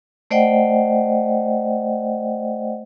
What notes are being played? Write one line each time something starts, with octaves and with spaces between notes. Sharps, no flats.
A3 C5 D5 D#5 F#5 G5